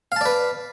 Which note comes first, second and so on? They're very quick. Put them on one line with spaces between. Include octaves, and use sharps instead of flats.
F5 A5 D5 B4